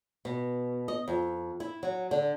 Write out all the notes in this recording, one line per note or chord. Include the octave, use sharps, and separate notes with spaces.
B2
D#5
F2
E4
F#3
D3